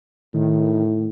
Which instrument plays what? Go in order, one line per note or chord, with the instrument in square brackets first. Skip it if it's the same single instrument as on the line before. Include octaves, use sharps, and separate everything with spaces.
[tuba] A2 [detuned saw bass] D#3